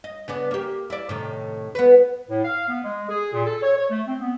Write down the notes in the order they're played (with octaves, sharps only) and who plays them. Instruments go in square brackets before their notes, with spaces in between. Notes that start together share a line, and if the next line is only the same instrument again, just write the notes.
[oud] D#5
C#3 B3 D4
A#3 G4
E4 D5
A2 C3 D#3
B3 B4
[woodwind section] A2
F5
B3
G#3
G#4
A#2
A4
C#5
C#5
A3
C4
B3